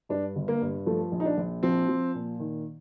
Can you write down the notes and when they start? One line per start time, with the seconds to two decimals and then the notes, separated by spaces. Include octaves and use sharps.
0.09 G2 D4
0.36 G1
0.48 A#3
0.61 G2
0.86 F3 A3
1.12 A#1
1.20 D#4
1.25 D4
1.37 A#1
1.63 F3 C4
1.88 F3
2.15 A#2
2.40 D#3